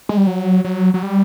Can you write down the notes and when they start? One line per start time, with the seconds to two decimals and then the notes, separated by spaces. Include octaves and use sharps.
0.09 G#3
0.17 G3
0.27 F#3
0.65 F#3
0.94 F#3
1.03 G3